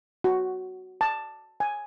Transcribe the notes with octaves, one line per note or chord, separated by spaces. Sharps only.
F#4
A5
G#5